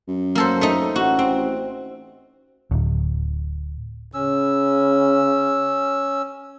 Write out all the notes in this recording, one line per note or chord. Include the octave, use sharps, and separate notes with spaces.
F#2
A#3 A4 C5
A3 D#4
A1 F#4
C4
D1
C#3 C#4 E6